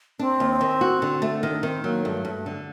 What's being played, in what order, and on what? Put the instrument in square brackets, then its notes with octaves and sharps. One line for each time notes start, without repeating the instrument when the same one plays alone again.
[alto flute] C4 [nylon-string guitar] D4
[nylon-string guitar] D#2
D#3
F#4
D3
A3
[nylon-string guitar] D#3 [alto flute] D4
[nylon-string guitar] D#3 [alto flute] C4
[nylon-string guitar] F#3 [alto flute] A#3
[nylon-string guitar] G2 [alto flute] A3
[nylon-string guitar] G2
D3